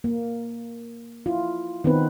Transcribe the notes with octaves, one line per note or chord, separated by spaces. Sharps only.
A#3
E4 F4
D#3 B3 C4 D#4 B4